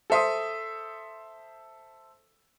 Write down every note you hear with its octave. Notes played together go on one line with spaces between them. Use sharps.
A4 C5 E5 C6 D#6